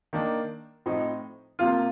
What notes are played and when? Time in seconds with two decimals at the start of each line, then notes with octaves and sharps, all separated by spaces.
0.13 D#3 A#3 D4
0.86 A2 F3 C4 D#4
1.59 C3 F3 A#3 F4